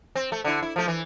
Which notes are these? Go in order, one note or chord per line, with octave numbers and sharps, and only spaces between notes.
C4
A3
D3 E4
E4
F3 A3
E3